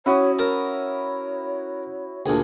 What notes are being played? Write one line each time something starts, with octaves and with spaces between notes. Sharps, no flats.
C#4 E4 F#4 C#5 D#6
A#4 C#5 A5
D2 A#2 D4 G#4